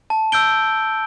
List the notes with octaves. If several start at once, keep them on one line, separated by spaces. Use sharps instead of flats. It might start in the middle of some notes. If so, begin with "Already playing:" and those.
A5
E6 G6 D7 G7